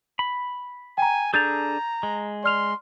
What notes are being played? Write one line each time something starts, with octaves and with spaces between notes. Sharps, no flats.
B5
G5 G#5 A#5
D4 G#4 A4 A#5 G6 A6 F7
G#3
D5 C6 F6 F7